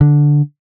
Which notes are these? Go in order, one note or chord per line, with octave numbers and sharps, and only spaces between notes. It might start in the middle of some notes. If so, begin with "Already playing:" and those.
D3